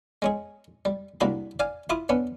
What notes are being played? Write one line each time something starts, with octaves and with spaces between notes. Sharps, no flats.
G#3 C#4 G#4
G3
C2 A#3 D4 F#4 G4 B5
D5 F5 G#5
E4 F4 B5 D6 D#6
B3 C#4 D4